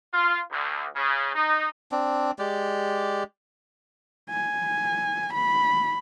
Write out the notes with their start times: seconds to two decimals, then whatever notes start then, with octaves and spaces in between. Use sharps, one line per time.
0.13 F4
0.51 D2
0.95 C#3
1.34 D#4
1.92 C4 D4
2.39 G#3 G4 D5
4.30 G#5
5.34 B5